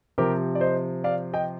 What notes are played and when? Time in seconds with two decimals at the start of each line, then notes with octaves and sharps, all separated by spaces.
0.18 C3 F3 G4 A#4
0.55 D5
0.61 C5 D#5
1.04 D5 F5
1.33 D#5 G5